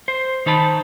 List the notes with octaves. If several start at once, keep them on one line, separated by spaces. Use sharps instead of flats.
C5
D#3 D#4 C5 A5 B5